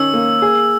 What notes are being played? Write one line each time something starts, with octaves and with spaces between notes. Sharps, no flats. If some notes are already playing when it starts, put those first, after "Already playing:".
Already playing: D#3 C#4 E6
A#3
G#4